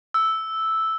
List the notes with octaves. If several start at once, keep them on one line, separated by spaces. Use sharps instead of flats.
E6